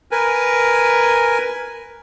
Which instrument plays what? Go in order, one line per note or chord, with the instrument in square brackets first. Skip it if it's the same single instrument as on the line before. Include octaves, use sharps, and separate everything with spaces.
[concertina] A#4 B4 G#5